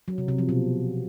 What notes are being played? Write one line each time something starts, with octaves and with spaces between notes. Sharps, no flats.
F#3
C3
C3
F3
B2